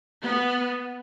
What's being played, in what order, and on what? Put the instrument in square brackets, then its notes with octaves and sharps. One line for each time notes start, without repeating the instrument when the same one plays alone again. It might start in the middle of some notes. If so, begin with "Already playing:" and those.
[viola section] B3